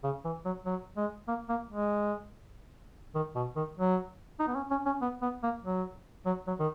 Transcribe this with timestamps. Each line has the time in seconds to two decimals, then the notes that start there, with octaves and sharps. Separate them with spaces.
0.04 C#3
0.25 E3
0.45 F#3
0.66 F#3
0.97 G#3
1.28 A#3
1.49 A#3
1.70 G#3
3.15 D#3
3.36 B2
3.56 D#3
3.77 F#3
4.39 D#4
4.48 B3
4.55 C#4
4.71 C#4
4.86 C#4
5.02 B3
5.22 B3
5.43 A#3
5.64 F#3
6.26 F#3
6.47 F#3
6.59 D#3